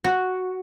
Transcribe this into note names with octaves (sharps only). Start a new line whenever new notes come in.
F#4